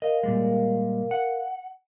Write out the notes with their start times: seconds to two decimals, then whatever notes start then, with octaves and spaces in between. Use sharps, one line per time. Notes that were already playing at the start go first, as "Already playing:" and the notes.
0.02 A#4 D#5 F5
0.23 A#2 G3 G#3
1.11 F#5